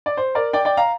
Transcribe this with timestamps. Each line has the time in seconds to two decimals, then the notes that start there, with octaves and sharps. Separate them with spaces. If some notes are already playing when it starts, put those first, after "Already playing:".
0.06 D5
0.17 C5
0.35 A#4 D5
0.53 D5 G5
0.65 D5 G5
0.77 F5 A#5